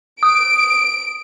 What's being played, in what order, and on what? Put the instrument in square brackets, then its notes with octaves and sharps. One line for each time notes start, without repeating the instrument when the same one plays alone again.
[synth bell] D#6 [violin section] D7